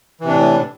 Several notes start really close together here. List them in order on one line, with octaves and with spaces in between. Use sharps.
E3 C3 D4 A2